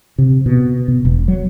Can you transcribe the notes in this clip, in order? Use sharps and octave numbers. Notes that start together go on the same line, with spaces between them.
C3
B2
B2
E1
F#3